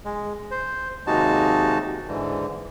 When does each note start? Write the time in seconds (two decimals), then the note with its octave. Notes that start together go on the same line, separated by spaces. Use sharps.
0.05 G#3
0.51 C5
1.07 D#2 C3 G#3 D#4 F#4 A5
2.08 G#2 D3 E3